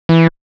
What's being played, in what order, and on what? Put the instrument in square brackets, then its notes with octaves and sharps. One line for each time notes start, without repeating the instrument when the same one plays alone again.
[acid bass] E3